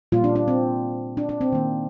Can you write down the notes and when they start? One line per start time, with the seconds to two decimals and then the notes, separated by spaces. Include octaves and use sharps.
0.12 A#2 G3 A#3 F4
0.24 D4
0.36 D4
0.48 C4
1.17 D4
1.29 D4
1.41 C4
1.52 D#3 A#3